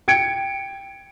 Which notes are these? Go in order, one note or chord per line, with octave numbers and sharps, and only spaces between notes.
G5 G#6 C#7 D7